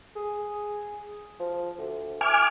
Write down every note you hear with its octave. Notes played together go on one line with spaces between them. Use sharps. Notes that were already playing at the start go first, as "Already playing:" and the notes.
G#4
F3
D2
E4 G#5 D6 F6